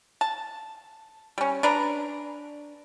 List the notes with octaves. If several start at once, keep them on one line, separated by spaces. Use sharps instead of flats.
A5
G3 C#4
D4 B4 D5 A#5